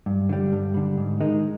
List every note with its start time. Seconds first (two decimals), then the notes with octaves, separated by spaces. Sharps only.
0.06 G2
0.29 D3 G3
0.52 G2
0.74 D3 G3
0.97 G#2
1.21 D#3 G#3 D#4